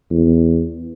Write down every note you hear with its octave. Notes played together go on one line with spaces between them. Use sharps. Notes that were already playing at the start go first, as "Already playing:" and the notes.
E2